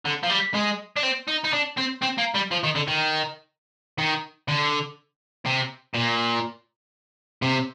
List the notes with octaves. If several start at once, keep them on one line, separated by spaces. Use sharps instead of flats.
D3
F3
G3
G#3
D4
C4
D#4
D#4
D4
C4
C4
A#3
G3
F3
D#3
D3
D#3
D#3
D3
C3
A#2
C3